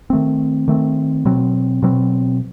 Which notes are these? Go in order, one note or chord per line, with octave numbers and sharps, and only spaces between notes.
D#3 A3 C4
D#3 A3 C4
B2 F#3 C4
B2 F#3 C4